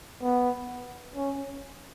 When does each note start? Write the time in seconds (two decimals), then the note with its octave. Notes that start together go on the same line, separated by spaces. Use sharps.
0.22 B3
1.16 C#4